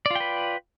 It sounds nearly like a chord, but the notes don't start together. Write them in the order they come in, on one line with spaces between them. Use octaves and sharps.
D5 F4 G5 B4